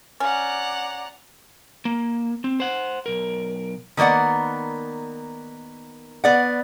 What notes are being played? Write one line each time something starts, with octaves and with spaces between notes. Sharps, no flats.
C#4 D5 F#5 A#5
A#3
C4
C5 F#5
B1 A#4
D#3 A#3 B3 D5 F#5
B3 D5 F#5